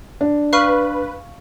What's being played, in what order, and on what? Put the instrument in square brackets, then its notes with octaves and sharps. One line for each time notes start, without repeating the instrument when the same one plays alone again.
[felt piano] D4
[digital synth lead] B4 [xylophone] F5 C#6 F6